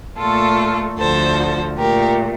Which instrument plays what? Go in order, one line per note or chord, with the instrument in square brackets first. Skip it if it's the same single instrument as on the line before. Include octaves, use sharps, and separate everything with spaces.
[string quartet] A#2 A3 F4 A4
D2 D3 F3 A4 C5
A#2 A3 G4 A#4